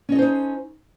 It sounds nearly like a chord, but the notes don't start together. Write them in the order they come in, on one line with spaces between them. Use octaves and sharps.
C#4 D#5 A4 C5 D#4